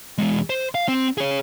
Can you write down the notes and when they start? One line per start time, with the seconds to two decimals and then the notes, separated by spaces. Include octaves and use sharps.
0.18 E2 G#3
0.50 C5
0.75 F5
0.88 C4
1.18 G#4 C#5